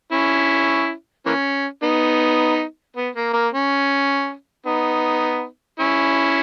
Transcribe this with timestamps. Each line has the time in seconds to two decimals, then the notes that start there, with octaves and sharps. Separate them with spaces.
0.12 C#4 E4
1.26 E3 A#3 C#4
1.83 B3 D#4
2.96 B3
3.15 A#3
3.33 A#3
3.53 C#4
4.66 B3 D#4
5.79 C#4 E4